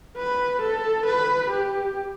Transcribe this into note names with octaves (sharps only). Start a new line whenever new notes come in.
B4
A4
B4
G4